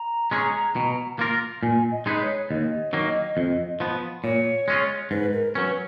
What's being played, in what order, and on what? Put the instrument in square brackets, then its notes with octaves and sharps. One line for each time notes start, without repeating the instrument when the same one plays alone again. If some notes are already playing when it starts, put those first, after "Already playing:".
Already playing: [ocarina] A#5
[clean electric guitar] G#3 C#4 G#4
B2
A#3 F4 A#4
[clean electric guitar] A#2 [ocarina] G#5
[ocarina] D#5
[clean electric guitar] G#3 D#4 G#4 B4
[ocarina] C#5
[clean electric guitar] D#2 [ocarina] D#5
[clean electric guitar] D#3 F#3 A#3
F2
F3 B3
[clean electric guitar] A#2 [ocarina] C#5
[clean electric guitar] G#3 C#4 F4
[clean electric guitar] G#2 [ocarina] B4
[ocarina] A#4
[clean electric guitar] F#3 C#4 [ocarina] B4